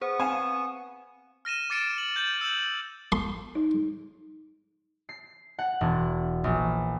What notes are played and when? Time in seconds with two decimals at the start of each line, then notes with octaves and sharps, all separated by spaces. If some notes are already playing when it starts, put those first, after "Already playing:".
0.01 B3 G#4 C5 C#6 D#6
0.20 C4 F5 G#5 E7
1.45 F6 A#6 D#7 E7
1.70 D6 A6 C#7 D7 E7
1.98 F#7
2.16 G6 A6 F#7
2.41 E6 E7 F#7
3.12 C6
3.55 D#4
5.09 C7
5.59 F#5
5.81 E1
6.44 A#1